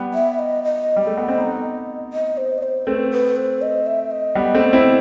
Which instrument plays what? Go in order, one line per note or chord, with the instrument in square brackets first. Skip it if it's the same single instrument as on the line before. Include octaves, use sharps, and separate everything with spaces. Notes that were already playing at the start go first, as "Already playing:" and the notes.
Already playing: [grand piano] G3 B3
[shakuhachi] E5
D#5
D#5
[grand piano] G3
A3
B3
C4
B3 D#4
[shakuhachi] D#5
C5
D#5
C5
[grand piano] A3 C4 [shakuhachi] B4
[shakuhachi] B4
C5
D#5
E5
D#5
[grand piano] G3 B3
A3 C4
C4 E4